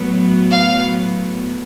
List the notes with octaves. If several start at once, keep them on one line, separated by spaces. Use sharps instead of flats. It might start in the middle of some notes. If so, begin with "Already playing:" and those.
Already playing: A2 F#3 B3
F5